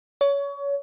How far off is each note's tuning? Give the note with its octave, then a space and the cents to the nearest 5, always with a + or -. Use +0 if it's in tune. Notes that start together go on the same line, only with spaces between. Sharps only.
C#5 +25